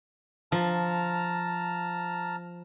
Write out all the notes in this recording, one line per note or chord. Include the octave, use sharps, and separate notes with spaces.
F3 A5 A#5 F6